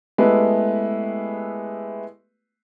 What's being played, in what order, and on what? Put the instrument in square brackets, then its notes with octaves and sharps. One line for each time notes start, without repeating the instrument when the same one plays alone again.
[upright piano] G#3 A3 B3 E4 G4 B4